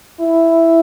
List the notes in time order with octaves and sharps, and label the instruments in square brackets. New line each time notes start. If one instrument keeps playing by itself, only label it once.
[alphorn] E4